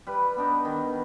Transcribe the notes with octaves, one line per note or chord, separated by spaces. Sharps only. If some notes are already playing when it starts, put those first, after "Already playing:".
G3 B4
B3 D4 D#4
D#3